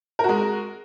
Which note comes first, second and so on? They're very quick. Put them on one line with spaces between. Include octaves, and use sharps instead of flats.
A#4 F#4 G#3